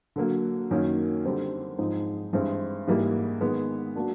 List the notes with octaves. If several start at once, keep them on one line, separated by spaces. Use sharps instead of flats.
D3 F#3 A#3
F#2 D#3 F#3 A#3 C#4
D3 G3 C4 D#4
G#2 F3 G#3 C4 D#4
G2 E3 G#3 C4
G#2 E3 G3 A#3
D#3 G#3 B3
F#3 A#3 D4 F#4